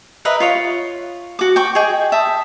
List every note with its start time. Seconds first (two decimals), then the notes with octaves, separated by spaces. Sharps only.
0.25 A#4 B4 D#5 E5
0.40 F4 C#5 F5
1.39 F#4 D6
1.56 G5 C#6 D6
1.75 G#4 D#5 G5
2.12 E5 A5 D#6